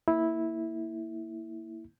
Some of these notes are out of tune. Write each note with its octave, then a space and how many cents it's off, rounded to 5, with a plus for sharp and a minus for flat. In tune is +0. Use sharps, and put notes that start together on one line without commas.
A#3 -20 E4 -10